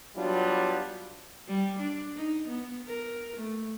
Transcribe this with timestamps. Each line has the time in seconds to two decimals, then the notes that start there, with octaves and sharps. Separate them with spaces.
0.16 F#3 G3 B3 D4 F4
1.47 G3
1.79 D4
2.16 D#4
2.48 B3
2.87 A#4
3.37 A3